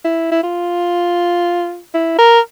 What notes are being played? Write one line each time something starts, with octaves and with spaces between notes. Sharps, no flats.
E4
E4
F4
E4
A#4